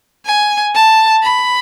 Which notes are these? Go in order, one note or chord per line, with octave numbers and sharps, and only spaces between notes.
G#5
A5
B5